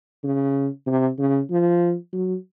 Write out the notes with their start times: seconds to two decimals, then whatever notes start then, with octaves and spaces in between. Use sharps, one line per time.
0.24 C#3
0.87 C3
1.18 C#3
1.50 F3
2.13 F#3